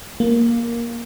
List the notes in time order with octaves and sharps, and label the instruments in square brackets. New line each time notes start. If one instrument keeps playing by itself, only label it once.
[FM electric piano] A#3